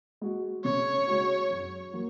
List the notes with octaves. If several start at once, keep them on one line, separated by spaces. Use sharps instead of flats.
G#3 F#4
C#3 C#5
G#3 F#4
F#2
F#3 A#3 F#4